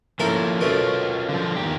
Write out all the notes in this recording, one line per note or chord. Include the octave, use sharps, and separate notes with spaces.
F3 A#3 C#4 E4 A4 A#4
F#2 B2 A3 C#4 F4
D3 F3
E2 D#3 G4